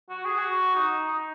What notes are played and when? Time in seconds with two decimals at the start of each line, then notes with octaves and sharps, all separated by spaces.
0.10 F#4
0.24 G#4
0.38 F#4
0.75 D#4
1.08 D#4